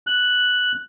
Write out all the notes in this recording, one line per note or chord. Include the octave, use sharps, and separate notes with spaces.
F#6